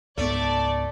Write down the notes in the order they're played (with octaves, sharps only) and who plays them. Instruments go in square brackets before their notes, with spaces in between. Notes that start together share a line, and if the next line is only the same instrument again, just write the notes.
[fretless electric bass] C#2 G#2 B3 [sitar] A3 [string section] D5